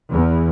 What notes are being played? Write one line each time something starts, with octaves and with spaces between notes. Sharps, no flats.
E2